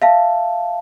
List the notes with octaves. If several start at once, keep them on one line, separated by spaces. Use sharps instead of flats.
E5 F5 A5